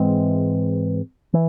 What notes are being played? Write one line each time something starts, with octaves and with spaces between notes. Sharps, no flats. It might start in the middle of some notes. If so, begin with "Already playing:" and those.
Already playing: G#2 E3 G#3 C4
E3